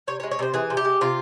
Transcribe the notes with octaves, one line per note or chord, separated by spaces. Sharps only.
C3 C#5
C#5
G#3
C#5
C3 C5
E3 G#4
C3
G4
G#3
C3 F4